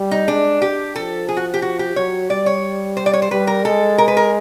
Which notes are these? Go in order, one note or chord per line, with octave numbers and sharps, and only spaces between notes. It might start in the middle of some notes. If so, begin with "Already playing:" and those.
Already playing: G3
D#4
G#3 D4
G4
F3 A4
G#4
F#4
G4
F#4
G4
F#3 C#5
G3 D5
C#5
C5
D5
C#5
C5
G3 B4
A#4
G#3 A4
A#4
B4
A#4